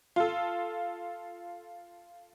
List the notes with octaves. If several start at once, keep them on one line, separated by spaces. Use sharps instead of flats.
F4 A4